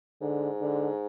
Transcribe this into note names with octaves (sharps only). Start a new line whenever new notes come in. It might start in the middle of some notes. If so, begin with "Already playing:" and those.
G#2 D3
D3